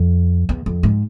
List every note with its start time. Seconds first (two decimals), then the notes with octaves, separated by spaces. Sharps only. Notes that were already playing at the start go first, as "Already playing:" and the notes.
Already playing: F2
0.49 E2
0.66 F2
0.83 G#2